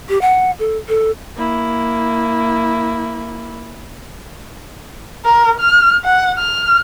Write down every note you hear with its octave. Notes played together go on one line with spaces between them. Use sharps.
G4
F#5
A4
A4
A#3 E4
A#4
F6
F#5
F6